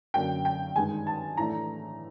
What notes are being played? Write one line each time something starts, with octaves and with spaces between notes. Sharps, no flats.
F#2 D3 F#3 A#3 G5
G5
G2 D#3 G#3 G#5
A5
A2 E3 A3 D4 A#5